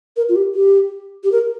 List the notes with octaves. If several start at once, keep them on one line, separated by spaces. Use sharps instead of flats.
A#4
F4
G4
G4
G4
A#4